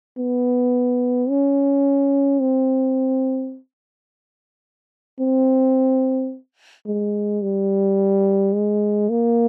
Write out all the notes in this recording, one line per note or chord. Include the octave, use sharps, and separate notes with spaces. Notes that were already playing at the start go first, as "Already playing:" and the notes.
B3
C#4
C4
C4
G#3
G3
G#3
A#3